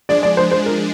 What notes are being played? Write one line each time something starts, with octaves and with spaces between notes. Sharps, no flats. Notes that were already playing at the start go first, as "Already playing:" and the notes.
F3 G#3 D4 G#4 D5
D5
C5
C5
A#4